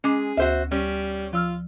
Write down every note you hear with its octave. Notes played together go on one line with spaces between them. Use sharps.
G#3 C#4 G#4 D6
D2 F#4 C5 E5
G3 C#4
F3 F4 E6 F6